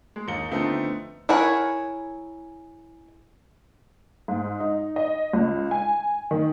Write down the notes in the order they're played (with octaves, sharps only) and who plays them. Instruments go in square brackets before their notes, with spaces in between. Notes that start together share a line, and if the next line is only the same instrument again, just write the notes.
[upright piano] G#3
D#2 D#4 C#7 G7
D3 F3 A3 B3 C4 D#4
[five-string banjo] E4 G#4 A#4 C#5 F#5
[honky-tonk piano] G#2
D#4
D#5
C#2
G#5
D#3